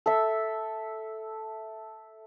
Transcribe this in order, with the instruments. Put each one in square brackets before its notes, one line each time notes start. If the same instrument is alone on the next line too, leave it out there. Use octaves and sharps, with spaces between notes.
[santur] A4 E5